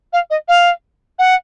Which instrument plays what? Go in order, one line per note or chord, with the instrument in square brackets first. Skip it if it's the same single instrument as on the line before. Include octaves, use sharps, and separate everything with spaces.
[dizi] F5
D#5
F5
F#5